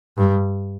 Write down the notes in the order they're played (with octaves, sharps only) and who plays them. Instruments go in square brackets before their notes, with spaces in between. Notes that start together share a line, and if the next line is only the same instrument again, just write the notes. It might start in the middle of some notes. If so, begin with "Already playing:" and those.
[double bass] G2